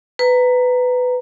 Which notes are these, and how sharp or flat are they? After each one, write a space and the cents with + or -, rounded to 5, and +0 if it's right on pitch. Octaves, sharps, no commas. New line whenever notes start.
B4 +15 A#5 +0